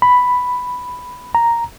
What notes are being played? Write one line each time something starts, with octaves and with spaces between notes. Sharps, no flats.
B5
A#5